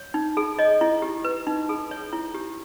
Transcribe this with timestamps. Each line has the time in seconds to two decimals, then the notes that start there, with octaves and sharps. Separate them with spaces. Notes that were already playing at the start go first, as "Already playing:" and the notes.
Already playing: C#5
0.14 D#4
0.37 G#4
0.59 C#5 D#5
0.81 E4
1.02 G4
1.25 B4
1.47 D#4
1.69 G#4
1.91 C#5
2.13 E4 C#5
2.35 G4